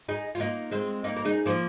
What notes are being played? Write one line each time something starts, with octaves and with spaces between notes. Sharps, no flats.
D#4 G#4
F4
A#3 D#4
G#3 C4
A#3 D#4
A#4
D#4 G#4
F3 A#3